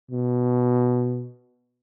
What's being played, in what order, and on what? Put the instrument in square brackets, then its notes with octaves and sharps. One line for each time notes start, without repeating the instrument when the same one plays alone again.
[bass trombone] B2